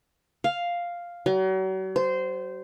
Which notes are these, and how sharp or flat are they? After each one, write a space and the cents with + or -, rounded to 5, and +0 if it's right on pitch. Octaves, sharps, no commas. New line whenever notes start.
F5 +0
F#3 +40
C5 -15